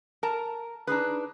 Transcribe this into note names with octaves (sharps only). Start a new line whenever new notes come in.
A#4 A5 A#5
D4 D#4 G#4 B4